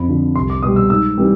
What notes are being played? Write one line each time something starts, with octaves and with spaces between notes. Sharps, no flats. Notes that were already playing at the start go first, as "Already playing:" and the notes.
Already playing: F2 B5
D3 F3
C2 C6
D6
B2 G3 D#6
E6
G#2 E6
E3 G3